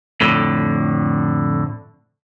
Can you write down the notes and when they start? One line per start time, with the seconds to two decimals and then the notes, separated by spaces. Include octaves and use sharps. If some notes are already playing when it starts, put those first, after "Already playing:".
0.21 F2 A2 D3